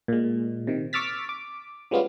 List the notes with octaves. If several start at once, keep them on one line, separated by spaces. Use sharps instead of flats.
A#2 G#3
C3 D#3
C#6 D6 E6 F6 A6 B6
D6
F3 G3 G#3 B3 C#4 F4